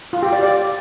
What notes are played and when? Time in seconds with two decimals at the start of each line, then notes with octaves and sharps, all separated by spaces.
0.13 F4
0.23 G4
0.33 D5
0.43 D5